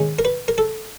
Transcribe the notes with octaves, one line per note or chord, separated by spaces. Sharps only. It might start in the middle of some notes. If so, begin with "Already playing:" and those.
Already playing: D#3 G#3 C#4
A#4
B4
A#4
A4